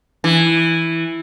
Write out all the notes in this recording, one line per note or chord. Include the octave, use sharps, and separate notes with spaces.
E3